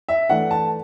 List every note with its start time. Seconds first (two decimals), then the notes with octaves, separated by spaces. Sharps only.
0.09 E5
0.30 E3 A3 D4 F#5
0.51 A5